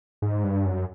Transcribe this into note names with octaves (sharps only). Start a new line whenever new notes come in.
G#2
G2
F#2